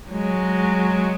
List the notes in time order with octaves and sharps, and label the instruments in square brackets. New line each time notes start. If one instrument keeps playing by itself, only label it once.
[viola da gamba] F#3 G#3